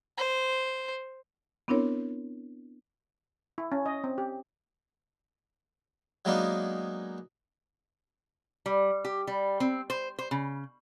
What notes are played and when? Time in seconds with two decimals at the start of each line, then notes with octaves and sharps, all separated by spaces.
0.18 C5
1.68 B3 C4 D4 E4 A#4 C#5
3.58 E4
3.72 C#4
3.86 D#5
4.04 C4
4.18 G4
6.25 F#3 G#3 A#3 B3 D4 D#4
8.66 G3
9.04 G4
9.27 G3
9.60 C4
9.90 C5
10.19 C5
10.31 C#3